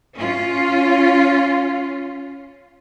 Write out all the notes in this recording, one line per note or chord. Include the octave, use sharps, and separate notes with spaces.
C#4 F4